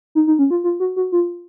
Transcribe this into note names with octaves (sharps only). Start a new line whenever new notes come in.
D#4
D#4
C#4
F4
F4
F#4
F#4
F4